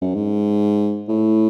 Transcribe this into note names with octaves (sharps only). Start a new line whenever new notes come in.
F#2
G#2
A2